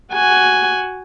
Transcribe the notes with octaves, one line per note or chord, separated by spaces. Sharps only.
F#4 G#5